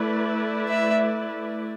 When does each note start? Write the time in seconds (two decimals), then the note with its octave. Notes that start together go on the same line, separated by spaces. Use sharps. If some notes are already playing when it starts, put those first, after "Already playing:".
Already playing: A3 E4 B4 D5
0.68 E5